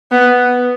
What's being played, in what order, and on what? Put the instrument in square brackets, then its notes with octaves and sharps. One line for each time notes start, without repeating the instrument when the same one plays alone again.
[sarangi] B3